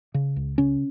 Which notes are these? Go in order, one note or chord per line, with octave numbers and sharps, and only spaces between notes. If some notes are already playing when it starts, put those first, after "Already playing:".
C#3
C#2
C#3 C#4